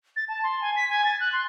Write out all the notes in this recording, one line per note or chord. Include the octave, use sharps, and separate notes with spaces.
A6
A5
C6
G#5
B6
G#5
A6
F#6
C6